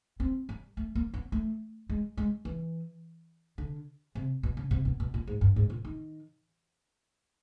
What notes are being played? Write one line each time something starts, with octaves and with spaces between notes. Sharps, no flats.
C4
G3
A3
A#3
B3
A3
G#3
G#3
E3
D3
C3
B2
C#3
C3
B2
B2
A#2
G#2
G2
G#2
A#2
D#3